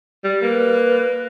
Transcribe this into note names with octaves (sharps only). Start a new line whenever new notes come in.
G3
A#3 B4